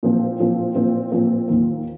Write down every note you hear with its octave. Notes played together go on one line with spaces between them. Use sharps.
A#2 F3 C4
A#2 F3 C4
A#2 F3 C4
A#2 F3 C4
D#2 D#3 A#3